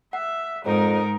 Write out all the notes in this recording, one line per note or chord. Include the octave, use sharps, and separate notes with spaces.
E5 F#5
F2 G#2 D#4 A#4